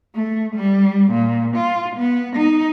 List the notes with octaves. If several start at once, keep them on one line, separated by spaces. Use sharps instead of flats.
A3
G3
A#2
F4
B3
D#4